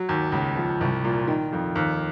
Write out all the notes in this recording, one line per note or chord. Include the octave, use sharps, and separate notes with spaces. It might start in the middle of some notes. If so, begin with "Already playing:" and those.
Already playing: F#3
D#2
C#2
F3
C2
A#2
D#3
F2
D#2